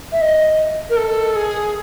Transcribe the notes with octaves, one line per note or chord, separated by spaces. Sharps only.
E5
D#5
A#4
A4
G#4